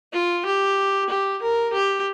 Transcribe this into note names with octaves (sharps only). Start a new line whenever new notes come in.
F4
G4
G4
A#4
G4